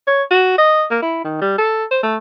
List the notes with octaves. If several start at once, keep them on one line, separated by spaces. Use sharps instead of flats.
C#5
F#4
D#5
A#3
E4
D#3
G3
A4
C5
A3